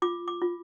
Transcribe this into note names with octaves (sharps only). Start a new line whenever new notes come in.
F4 D6
D6
F4